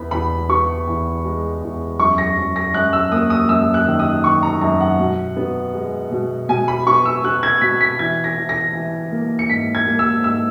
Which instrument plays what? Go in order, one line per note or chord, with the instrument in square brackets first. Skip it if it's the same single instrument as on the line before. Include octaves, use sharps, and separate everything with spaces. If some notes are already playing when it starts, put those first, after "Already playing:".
Already playing: [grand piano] E2 B3 B5
E2 B5
B3 C#6
E2
G#3
E2
F#2 C#6
A#6
F#2
A#6
F#2 F#6
E6
A#3 D#6
D#6
F#2 E6
F#6
D#3
D#6
D#3 C#6
A#5
F#2 A#5
F#5
B2
B3
G#3
B2
B2 G#5
B5
B3 C#6
E6
B3 F#6
G#6
B2 B6
B6
E3 G#6
A#6
E3
A#6
E3
A#3
C#7
G#2 B6
G#6
A#3
E6
G#2 E6